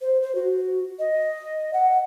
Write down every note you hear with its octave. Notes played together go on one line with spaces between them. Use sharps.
C5
C5
F#4
D#5
F#5